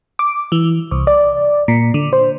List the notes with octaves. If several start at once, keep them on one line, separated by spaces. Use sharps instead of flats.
D6
E3
C2
D5
A#2
D3
C5